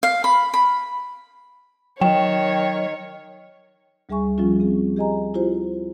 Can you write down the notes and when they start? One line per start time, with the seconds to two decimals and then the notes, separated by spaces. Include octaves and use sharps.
0.03 F5
0.24 B5
0.54 B5
2.01 D#3 F#3 C#5 G5
4.09 D2 G3 G#4 E5 G#5 C#6
4.38 F3 G3 C#4 F4
4.60 C4 G#4
4.96 G4 G#4 D#5 G#5 A#5
5.34 E4 F4 G4 C5